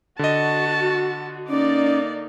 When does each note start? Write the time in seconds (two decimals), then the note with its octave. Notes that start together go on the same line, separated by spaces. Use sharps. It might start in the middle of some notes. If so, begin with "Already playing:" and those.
0.19 D3 F#4 D#5 A5
1.49 A#3 C#4 D#4 D5